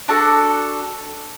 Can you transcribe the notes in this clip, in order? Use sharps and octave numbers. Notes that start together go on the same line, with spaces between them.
D4 F#4 A4 A5